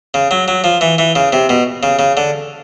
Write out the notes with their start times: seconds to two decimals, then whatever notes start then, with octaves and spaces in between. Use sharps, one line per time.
0.14 C#3
0.31 F#3
0.48 F#3
0.64 F3
0.81 E3
0.98 E3
1.16 C#3
1.33 C3
1.49 B2
1.83 C#3
1.99 C#3
2.17 D3